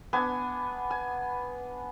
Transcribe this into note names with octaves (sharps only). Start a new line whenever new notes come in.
B3 D4 G#5
G#5